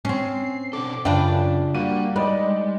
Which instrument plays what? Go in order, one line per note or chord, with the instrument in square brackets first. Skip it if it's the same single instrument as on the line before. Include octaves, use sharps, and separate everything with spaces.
[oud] C4 C#4 [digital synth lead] C7
[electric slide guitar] B2 D4 A4 [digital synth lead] D6
[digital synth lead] F#2 [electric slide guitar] C#3 [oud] D4 F4 B4 [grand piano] G5
[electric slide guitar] G3 [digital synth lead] A#3 [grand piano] F#4 D#7
[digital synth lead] G#3 [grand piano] D#4 D5 D#5 [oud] B4